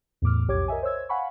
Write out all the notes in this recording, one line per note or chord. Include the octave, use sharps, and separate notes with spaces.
E2 A2 D6 F6
B1 F2 G4 C#5 D6 G#6
A#4 D#5 E5 G#5
C5 C#5 E6 G#6
F5 F#5 G#5 B5 C#6